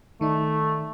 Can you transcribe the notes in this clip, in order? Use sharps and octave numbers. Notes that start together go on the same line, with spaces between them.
D#3 A3 D#4 D5